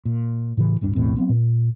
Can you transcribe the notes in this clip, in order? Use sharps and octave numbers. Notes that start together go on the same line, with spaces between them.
A#2
A2 C#3 E3
D1 G2 G3 D4
B1 E2 A2 C4
F#3 B3 C4
A#2